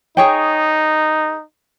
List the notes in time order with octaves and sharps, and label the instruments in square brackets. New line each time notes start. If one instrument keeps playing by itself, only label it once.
[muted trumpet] D#4 [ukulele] G#4 C#5 G5